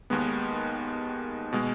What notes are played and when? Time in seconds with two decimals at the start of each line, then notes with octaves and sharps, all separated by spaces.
0.10 D#2 D#3 G#3 B3
1.53 B2 G#3